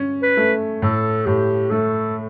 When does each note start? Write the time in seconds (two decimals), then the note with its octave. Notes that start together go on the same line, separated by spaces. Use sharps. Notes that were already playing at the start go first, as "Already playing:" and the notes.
Already playing: C#4
0.23 B4
0.37 A3
0.82 A2 A4
1.26 A2 G4
1.70 A3 A4